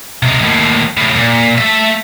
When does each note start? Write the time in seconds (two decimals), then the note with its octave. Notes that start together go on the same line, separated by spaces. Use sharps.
0.23 C3 G#3
0.42 D#2 A2
0.97 A2 C#3
1.16 A#2
1.58 A3 E5